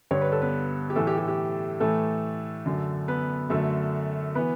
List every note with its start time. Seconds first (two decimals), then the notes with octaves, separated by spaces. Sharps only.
0.11 G2 D3 C#5
0.21 B4
0.32 A4
0.42 B3 B4
0.90 G4
0.96 A2 E3 A3 A4
1.07 G4
1.18 G4
1.28 G4
1.80 A2 E3 A3 A4
2.66 F#2 D3
3.08 B3 B4
3.50 F#2 D3 A3 A4
4.35 E3 B3 B4